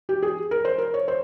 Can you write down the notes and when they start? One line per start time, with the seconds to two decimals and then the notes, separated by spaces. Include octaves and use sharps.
0.09 G4
0.23 G#4
0.51 A#4
0.65 C5
0.78 A#4
0.94 C#5
1.08 C5